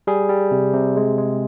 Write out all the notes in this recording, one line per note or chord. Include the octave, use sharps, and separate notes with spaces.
G3 G#4
G3
C3
C3
G#3
G#3